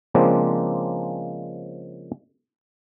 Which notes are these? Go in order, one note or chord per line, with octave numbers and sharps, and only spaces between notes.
C#3 F3 G#3 A#3 C4 D4